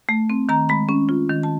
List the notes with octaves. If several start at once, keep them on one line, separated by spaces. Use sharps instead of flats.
A3
C4
D#3 A#5
G#3 B5
C#4
F4
D#3
A5